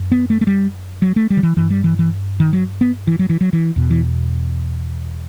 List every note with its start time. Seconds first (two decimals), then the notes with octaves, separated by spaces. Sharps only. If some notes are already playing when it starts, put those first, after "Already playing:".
Already playing: F#2
0.12 B3
0.30 A3
0.41 A3
0.47 G3
1.02 F#3
1.16 A3
1.30 G3
1.37 D#3
1.43 E3
1.57 G2 E3
1.70 G3
1.84 E3
1.99 E3
2.40 D#3
2.53 F#3
2.81 B3
3.07 E3
3.19 F#3
3.30 E3
3.41 F#3
3.53 E3
3.76 E2 B2
3.90 E3